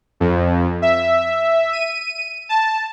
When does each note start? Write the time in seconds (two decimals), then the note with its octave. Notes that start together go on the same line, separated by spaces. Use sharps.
0.20 F2
0.82 E5
1.73 D#7
2.49 A5